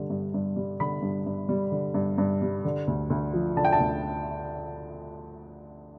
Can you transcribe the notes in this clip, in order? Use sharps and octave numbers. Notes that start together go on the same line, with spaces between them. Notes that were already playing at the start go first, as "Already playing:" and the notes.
Already playing: G2 D3 G3
G2
G2
G3
D3 B5
G2
G2
G3
D3
G2
G2
G3
D3
D2
D2
F3
D3 A5
G5
A5
D2